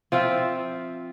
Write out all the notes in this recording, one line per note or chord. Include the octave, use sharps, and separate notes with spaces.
F3 C4 F4 E5